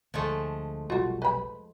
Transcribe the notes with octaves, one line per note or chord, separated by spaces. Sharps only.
D2 F3 G#3 A3
F1 B1 G3 F4 F#4
B4 B5